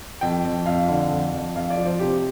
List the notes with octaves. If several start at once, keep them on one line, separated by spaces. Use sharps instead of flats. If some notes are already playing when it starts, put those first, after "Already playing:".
F2 G5
F2
F2 F5
D3
F2
F2
F2 F5
D5
F3
C5
C3 G4